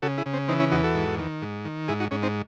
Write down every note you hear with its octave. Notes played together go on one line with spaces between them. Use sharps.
C#3 F#4 A4
E4 G#4
C#3
C4
E3 C4 D#4
C#4 E4
E2 D#4 F#4
F#4 A4
G#2
D#3
G#2
D#3
G#2 E4 G#4
D#4 F#4
G#2 C#4
C4 D#4